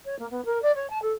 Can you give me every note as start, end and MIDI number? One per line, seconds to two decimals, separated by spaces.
0.05 0.18 73
0.19 0.29 58
0.30 0.44 59
0.45 0.61 70
0.62 0.72 74
0.76 0.89 73
0.90 1.01 81
1.02 1.12 69